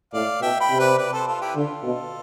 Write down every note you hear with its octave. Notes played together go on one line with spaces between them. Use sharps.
A2 D5 F5
B2 E5 G5
G5 B5
C3
B4 D5
B4 D5
A4 C5
F4 A4
E4 G4
B4
D3 F4 A4
B2